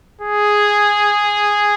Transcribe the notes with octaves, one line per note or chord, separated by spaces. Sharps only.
G#4